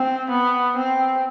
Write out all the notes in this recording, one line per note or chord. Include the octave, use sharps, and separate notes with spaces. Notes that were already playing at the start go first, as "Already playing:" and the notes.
Already playing: C4
B3
C4